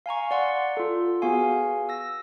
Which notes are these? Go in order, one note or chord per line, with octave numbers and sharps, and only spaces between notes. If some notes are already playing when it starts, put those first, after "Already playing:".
F5 G#5 A#5 C#6
D5 F#5 C6
F4 A4
B3 F#4 G#4 F5 G#5
E6 A#6